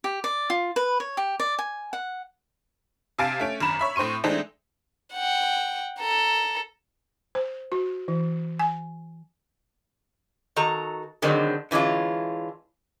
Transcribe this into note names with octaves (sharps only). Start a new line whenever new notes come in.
G4
D5
F4
B4
C#5
G4
D5
G#5
F#5
C3 F5 G#5 A5 A6 D7
A3 C#4 D7
G#1 F#2 A#5 B5 E7
C#5 E5 B5
A2 C4 C6 C#6 D#7
E3 G#3 A3 C4 D4 D#4
F#5 G5
A4 A#5
C5
F#4
E3
G#5
D#3 F#4 A4 A#5
B2 D3 D#3 F#3 G#3 C4
D3 E3 G#3 C#4 F4